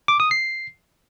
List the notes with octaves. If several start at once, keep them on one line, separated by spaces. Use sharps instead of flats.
D6
D#6
C7